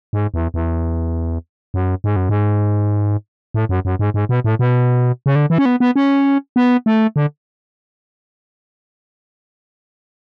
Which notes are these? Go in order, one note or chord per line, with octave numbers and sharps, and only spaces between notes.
G#2
E2
E2
F#2
G#2
F#2
G#2
A2
F#2
F#2
G#2
G#2
B2
A2
B2
C#3
D3
E3
C#4
B3
B3
C#4
B3
A3
D3